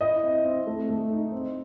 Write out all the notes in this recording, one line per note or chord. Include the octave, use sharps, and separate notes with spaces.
E4 D#5
C4
C4
A3
A3
D#4
C4